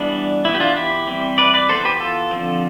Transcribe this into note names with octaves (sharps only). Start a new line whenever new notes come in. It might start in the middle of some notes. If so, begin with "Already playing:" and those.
Already playing: E3 G3 B3 D4
E3 B3 E4
G4
D4 F4
E4 G4
E3 G3 C4
B4 D5
B4 D5
E3 B3 A4 C5
G4 B4
F4 A4
D3 F3 C4